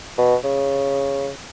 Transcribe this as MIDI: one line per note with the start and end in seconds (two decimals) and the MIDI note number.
0.18 0.35 47
0.44 1.30 49